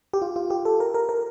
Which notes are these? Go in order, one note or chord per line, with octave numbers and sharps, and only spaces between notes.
G4
F4
F4
G4
A4
A#4
A#4
A#4